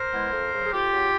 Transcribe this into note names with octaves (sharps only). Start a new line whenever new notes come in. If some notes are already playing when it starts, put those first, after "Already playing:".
Already playing: A#4 C5
G#3 B3 E4
F2
C#3 F#3
G#4
F2 F4 G4
C#3 F#3